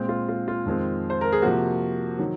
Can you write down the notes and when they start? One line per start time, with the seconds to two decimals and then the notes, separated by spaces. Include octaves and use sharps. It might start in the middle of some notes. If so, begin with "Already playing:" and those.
Already playing: A#2 G#3 C4
0.09 F4
0.29 F4
0.48 F4
0.66 F2 D#3 G#3 C4
1.10 C5
1.21 A#4
1.32 G#4
1.42 C3 F3 A#3 F#4
2.19 D#3 F#3